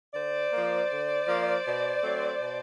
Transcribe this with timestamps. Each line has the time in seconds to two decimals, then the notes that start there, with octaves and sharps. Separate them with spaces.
0.14 D3 C5 D5
0.52 F3 A#3
0.90 D3
1.27 F3 A#3
1.64 B2
2.02 F#3 A3 C4
2.40 B2